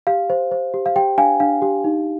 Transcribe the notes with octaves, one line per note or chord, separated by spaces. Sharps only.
G4 F5
C5
C5
G4
F5
G4 G5
D4 F5 G#5
D4 F5
G4
D#4